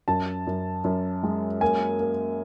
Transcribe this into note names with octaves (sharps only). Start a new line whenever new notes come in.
F#2 A5
F#2
F#2
G#3
A#3 G#5
A#3